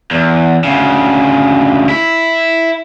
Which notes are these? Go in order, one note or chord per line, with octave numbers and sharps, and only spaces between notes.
E2
D2 C#3
E4